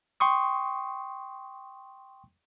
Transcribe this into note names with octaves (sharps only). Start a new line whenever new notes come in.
G5 C6 C#6 D#6